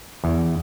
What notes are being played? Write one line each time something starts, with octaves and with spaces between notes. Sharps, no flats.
E2